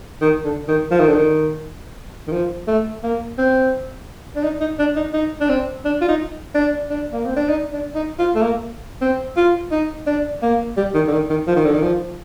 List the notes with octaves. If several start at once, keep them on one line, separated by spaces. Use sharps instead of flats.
D#3
D3
D#3
F3
D#3
D3
D#3
D#3
F3
A3
A#3
C4
D4
D#4
D#4
D4
D#4
D#4
D4
C4
D4
F4
D#4
D4
D4
A#3
C4
D4
D#4
D4
D#4
F4
A3
A#3
C4
F4
D#4
D4
A#3
G3
D#3
D3
D#3
D#3
F3
D#3
D3
D#3
F3